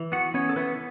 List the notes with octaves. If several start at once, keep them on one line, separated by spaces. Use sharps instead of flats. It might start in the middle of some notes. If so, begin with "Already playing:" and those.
Already playing: E3
B3 F#4 F#5
B3 C#4 C#5
A4
E3 B3 B4